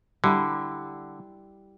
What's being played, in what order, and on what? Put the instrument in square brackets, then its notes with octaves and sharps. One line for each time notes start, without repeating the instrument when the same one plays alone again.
[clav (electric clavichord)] D3 [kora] G3 E4